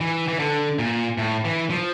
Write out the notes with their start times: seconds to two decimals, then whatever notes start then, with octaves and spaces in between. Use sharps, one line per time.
0.01 E3
0.28 E3
0.39 D3
0.79 A#2
1.18 A2
1.45 E3
1.70 F3